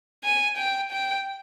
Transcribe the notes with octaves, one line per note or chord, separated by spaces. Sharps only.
G#5
G5
G5